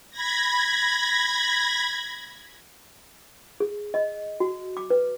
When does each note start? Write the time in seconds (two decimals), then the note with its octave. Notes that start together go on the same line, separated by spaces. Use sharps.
0.10 B5 G#6 A#6
3.60 G#4
3.94 D#5
4.40 F#4
4.77 D6
4.90 B4